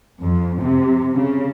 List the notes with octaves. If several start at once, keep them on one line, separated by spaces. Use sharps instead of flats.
F2
C3
C#3